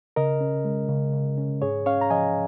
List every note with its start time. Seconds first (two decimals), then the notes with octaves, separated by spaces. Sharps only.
0.16 C#3 A#4 D#5
0.41 C#4
0.65 G#3
0.89 C#3
1.13 C#3
1.38 C#4
1.62 G#2 G#4 C#5
1.86 C#4 C#5 F5
2.01 A#5
2.10 F3 D#5 G#5